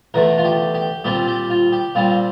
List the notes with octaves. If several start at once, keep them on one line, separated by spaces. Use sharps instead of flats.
E2 D3 A3 A#4
F4
G4
G4
A#2 G3 C4 F4 G4
G4
F4
G4
A#2 G3 C4 F4